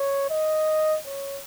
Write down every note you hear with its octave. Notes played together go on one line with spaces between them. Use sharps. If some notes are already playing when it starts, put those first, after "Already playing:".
Already playing: C#5
D#5
C#5